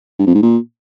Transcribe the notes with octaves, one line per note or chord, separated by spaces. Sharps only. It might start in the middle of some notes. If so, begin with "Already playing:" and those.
G2
F2
G#2
A#2